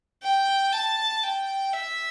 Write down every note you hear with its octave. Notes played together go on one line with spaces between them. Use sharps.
G5
A5
G5
E5